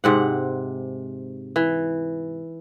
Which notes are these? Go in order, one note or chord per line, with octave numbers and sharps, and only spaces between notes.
G#2 C3 F#5
E3